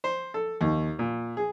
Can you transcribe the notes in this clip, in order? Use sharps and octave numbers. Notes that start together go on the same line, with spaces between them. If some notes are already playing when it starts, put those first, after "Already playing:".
C5
A4
D#2
A#2
G#4